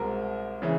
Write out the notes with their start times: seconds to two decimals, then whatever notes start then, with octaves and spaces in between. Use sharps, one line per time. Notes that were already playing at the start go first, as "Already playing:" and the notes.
Already playing: C2 B2 G#3 C4 A#4
0.62 C#3 E3